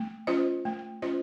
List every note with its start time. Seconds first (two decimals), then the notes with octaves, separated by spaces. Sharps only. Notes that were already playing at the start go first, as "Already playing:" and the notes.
Already playing: A3
0.27 C#4 F4 C5 D#5
0.65 A3
1.02 C#4 F4 C5 D#5